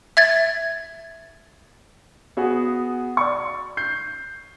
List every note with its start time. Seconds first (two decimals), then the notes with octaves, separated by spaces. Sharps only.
0.17 E5 G#6 A6
2.37 B3 F#4 G#4
3.17 D5 C#6
3.77 G6 C7